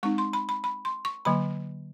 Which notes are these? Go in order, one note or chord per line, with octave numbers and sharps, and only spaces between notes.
G#3 C4 D#4 C#6
C6
B5
B5
B5
C6
C#6
D3 F#3 A#3 B5